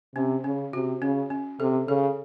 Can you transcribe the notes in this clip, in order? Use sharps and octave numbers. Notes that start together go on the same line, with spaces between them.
C3 C#4
C#3 C#4
C3 F#4
C#3 C#4
C#4
C3 A4
C#3 A4